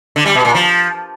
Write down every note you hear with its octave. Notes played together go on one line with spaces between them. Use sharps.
D3
G3
B2
A#2
F3